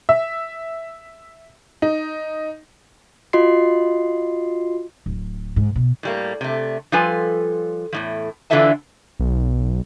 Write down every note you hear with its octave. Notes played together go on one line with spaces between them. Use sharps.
E5
D#4
F4 F#4 D#5 C6 C7
D1
G#2
B2
A2 G3 A#3
C3 A3
F3 G3 F4 A4 B4 G#5
E2 A2 F3
D3 E3 F4 A4 E5 A5
B1